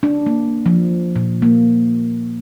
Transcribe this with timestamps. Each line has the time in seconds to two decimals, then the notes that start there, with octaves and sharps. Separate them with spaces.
0.03 D4
0.26 A#3
0.66 F3
1.16 A#2
1.42 A#3